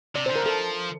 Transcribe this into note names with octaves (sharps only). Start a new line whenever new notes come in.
C3 D5
C5
D3
A#4
F3 A4